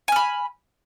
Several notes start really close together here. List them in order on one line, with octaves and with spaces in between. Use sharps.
G#5 F6 B5